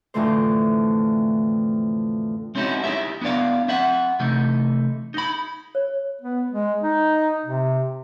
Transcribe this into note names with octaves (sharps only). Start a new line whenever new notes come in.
F2 A2 D3 E3 A3 C5
G#3 C4 C#4 D#4 E4 F#4
D#4 E4 G4 E5
B3 D4 E4 D5 F5
C4 E5 F#5
C3 E3 A3 D#4
D#4 B5
C#5
B3
G#3
D#4
C3